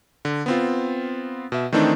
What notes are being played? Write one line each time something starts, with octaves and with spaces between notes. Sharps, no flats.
D3
B3 C4 F4
B2 E5
D#3 E3 A3 C4 D4 D#4